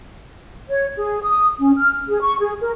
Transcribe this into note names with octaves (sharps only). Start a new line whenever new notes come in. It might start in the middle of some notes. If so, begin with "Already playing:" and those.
C#5
G#4
D#6
C#4
F6
G#4
C#6
G#4
A#4